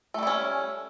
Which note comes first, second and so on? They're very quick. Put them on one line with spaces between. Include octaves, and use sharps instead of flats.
A3 G3 E4 C#4